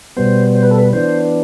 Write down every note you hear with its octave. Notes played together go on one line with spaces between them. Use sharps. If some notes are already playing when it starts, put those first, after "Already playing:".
B2 G3 B3 C5
C5
B4
A4
B4
E3 B3 D4 C5